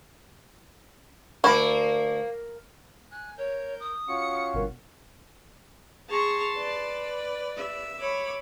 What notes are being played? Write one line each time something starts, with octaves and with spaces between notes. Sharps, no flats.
D2 A#3 E4 A4 D5
G#5 F#6
A#4 C#5 G6
D#6
C#4 F4 F#4 C#7
G1 B2 A#4
G#4 A5 A#5 C6 C#6
B4 D5
E5
C#5 B5 D6